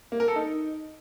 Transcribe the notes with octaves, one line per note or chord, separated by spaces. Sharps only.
A#3
A#4
A4
D#4